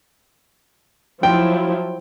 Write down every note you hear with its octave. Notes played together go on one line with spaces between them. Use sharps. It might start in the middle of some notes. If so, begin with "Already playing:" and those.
F3 F#3 E4 G5